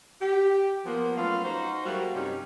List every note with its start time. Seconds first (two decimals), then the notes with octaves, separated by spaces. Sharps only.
0.21 G4
0.85 F3 A#3 B3
1.16 F#3 A3 B3 C#4 F4 F5
1.44 D#4 F#4 C5
1.85 F#3 G3 A3 A#3 F#4 F5
2.14 G2 C3 C#4 D#4 G4